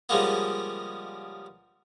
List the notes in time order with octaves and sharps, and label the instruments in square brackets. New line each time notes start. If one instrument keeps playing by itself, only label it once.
[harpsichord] C#3 F3 G3 G#3 A#3 B3